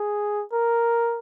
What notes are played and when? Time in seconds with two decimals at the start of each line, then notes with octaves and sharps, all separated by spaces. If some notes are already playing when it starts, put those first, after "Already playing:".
Already playing: G#4
0.52 A#4